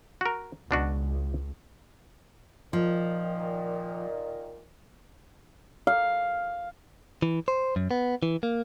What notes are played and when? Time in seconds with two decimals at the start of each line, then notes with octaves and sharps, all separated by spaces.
0.21 F#4 A#4
0.71 C#2 B2 D4 F#4
2.73 A#2 D#3 F3
5.87 F5
7.22 E3
7.48 C5
7.76 F#2
7.91 B3
8.23 E3
8.43 A#3